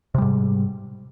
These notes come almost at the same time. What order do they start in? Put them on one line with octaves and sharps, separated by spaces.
C3 G3 G#2